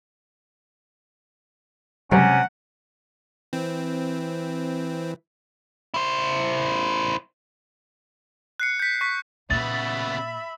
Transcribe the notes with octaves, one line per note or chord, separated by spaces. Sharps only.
C#2 F#2 C3 G3 C#4 F#5
E3 C4
E4 C5
F#6 C7 C#7
G6 B6
C#6 B6
A#2 C#3 A#3 B3 E5 B5 A6